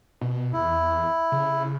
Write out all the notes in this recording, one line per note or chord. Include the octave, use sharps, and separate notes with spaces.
B2
E2 E4
C#3